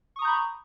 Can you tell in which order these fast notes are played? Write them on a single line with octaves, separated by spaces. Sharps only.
C#6 D#6 A#5 G6 B5